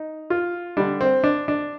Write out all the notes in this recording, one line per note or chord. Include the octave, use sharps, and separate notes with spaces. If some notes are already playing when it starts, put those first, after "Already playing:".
Already playing: D#4
F4
D3 G3 D4
C4
D4
D4